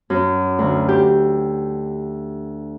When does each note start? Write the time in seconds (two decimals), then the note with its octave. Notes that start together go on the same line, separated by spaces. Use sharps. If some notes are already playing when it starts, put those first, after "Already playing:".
0.10 F#2
0.59 D2
0.89 G4